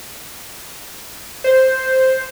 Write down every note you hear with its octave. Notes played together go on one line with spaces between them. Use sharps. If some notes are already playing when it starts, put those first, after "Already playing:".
C5